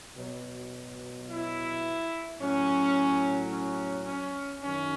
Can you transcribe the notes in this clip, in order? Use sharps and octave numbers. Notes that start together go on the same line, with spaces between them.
B2 F#3
E4
A2 F#3 C#4
C#4
C#4
F#2 D#3 F#3 C#4